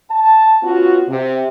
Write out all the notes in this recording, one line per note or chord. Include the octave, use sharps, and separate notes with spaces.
A5
B3 C#4 F4 F#4
C3